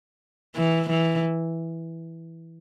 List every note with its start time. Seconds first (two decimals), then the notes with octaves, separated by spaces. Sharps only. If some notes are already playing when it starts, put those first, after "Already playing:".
0.56 E3
0.90 E3